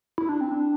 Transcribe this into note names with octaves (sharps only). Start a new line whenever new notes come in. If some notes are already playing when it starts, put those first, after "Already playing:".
E4
D4
C4
D4